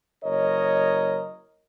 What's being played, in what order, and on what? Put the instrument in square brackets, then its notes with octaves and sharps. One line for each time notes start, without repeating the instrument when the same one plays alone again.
[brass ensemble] F#1 A#4 C#5 D#5